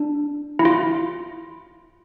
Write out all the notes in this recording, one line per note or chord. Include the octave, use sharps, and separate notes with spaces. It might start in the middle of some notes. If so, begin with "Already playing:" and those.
Already playing: D4
E4
F4